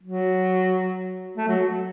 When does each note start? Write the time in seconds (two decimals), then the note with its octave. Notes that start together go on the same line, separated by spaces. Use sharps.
0.03 F#3
1.37 A3
1.48 F#3